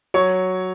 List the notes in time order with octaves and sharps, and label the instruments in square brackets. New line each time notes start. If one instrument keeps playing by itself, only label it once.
[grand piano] F#3 C#5 C#6